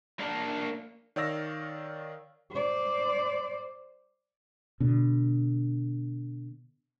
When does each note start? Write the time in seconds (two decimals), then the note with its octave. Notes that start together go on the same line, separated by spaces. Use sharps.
0.20 A#3 D4
1.16 D#3 C#5 D5 F5 E6 A#6
2.51 C5 D5
4.80 B2 D3